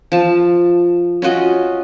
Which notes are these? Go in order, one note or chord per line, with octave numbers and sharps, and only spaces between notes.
F3 A5
C#4 F4 F#4 D#5